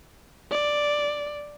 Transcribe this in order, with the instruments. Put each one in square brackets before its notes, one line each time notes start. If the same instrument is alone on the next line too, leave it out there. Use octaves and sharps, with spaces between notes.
[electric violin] D5